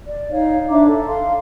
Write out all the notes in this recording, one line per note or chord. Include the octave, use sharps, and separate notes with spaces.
D5
D#4 C#5 F5
D4 E5 A#5 D6
A4
F5 C6